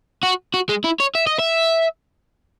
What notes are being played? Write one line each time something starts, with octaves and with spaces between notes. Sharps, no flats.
F#4
F#4
G#3
E4
C#5
E5
D#5
E5